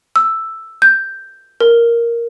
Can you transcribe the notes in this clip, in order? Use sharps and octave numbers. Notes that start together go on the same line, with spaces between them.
E6
G6
A#4